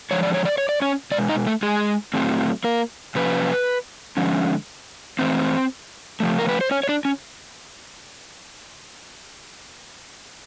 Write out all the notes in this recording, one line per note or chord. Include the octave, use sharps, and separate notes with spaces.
D3 F3 G#3 C#5
D5
C#5
D5
C#5
D5
C#4 C#5
B2 G#3 D5
D#4 D#5
A3 A4
G#3 G#4
A2 F#3 A3 C4
A#3 A#4
C3 F3 A#3 C#4 B4
D3 F3 G#3 C#4
E3 A3 C4 C5
C#3 F3 A3
A#4
B4
C5
C#4 C#5
C#5
D4 D5
C#4